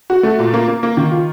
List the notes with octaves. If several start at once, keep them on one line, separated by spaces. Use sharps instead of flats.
F#4
A3
A#2
A#3
A#3
A#3
D#3
F4